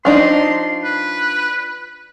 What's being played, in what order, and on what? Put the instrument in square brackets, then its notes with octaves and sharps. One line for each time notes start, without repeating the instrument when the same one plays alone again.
[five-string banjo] F3 D4 D#4 [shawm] C6
[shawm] B4